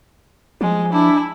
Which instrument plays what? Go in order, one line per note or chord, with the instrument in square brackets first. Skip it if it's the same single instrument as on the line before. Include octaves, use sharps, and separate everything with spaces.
[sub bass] F3 [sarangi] G#3
[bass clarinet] D4 [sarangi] E4